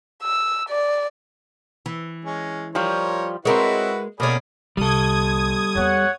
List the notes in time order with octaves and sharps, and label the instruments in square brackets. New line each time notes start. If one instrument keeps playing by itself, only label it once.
[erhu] E6
D5
[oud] E3
[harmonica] G#3 C#4
[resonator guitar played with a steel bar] F3 G3 F4 [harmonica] A#4 C#5
[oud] G#3 A#4 [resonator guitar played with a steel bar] C4 C#5 [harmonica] E4 F#4 B4
[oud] B2 C#4 [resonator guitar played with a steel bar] A3 A#3 [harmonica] G#4 D5 B5
[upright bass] C2 [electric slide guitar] G3 A4 [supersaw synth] D#6 G#6
[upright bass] E2 B3 [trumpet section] C#5 F#5